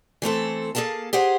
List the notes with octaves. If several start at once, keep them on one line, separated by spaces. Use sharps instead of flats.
E3 A3 C4 A4
A#3 G#4 A4 F5 A5
G4 G#4 C5 F#5